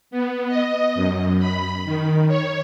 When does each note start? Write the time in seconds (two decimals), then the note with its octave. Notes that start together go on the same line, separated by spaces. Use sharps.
0.11 B3
0.47 D#5
0.95 F#2
1.39 B5
1.85 D#3
2.28 C#5